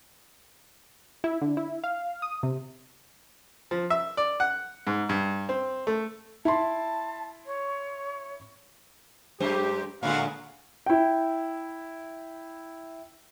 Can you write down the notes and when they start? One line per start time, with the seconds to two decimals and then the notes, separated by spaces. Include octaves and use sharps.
1.24 E4
1.41 D3
1.57 E4
1.84 F5
2.22 D#6
2.43 C3
3.71 F3
3.90 E5
4.17 D5
4.40 F#5
4.87 G#2
5.09 G2
5.49 C4
5.87 A3
6.45 E4 A5 B5 C6
7.46 C#5
9.40 F#2 G#3 G4 C5
10.03 A2 D3 G#3 F#4 F5 F#5
10.86 E4 G5